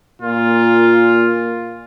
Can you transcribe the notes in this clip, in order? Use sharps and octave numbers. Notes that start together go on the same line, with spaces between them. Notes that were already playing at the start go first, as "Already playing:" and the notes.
A#2 F4